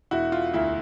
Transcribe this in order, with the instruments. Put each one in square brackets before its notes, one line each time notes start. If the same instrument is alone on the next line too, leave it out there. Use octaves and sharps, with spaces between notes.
[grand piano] E1 E4 F#4
F4
D2 E4